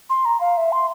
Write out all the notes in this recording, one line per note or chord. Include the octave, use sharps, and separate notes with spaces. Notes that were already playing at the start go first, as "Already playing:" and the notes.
C6
A#5
F5
E5
C6